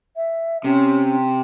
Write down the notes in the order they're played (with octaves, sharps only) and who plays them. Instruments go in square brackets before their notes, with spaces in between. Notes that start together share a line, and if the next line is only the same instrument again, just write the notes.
[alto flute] E5
[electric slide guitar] C3 [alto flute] C#4